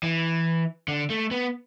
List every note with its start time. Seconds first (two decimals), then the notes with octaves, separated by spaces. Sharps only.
0.03 E3
0.88 D3
1.10 A3
1.31 B3